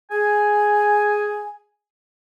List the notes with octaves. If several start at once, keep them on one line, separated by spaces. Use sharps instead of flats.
G#4 G#5